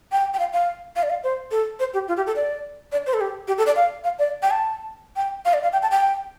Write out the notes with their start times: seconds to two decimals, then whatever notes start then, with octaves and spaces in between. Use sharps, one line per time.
0.12 G5
0.34 G5
0.39 F5
0.53 F5
0.96 F5
1.03 D5
1.10 F5
1.24 C5
1.51 A4
1.80 C5
1.94 G4
2.08 F4
2.17 G4
2.27 A4
2.36 D5
2.92 D5
3.06 C5
3.14 A4
3.21 G4
3.48 G4
3.58 A4
3.66 D5
3.76 F5
4.04 F5
4.19 D5
4.42 G5
4.51 A5
5.16 G5
5.45 F5
5.53 D5
5.63 F5
5.73 G5
5.82 A5
5.91 G5